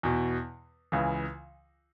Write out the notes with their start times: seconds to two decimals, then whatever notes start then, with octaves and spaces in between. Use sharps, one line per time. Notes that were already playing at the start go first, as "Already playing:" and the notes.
0.03 E2 B2
0.92 C#2 C#3 E3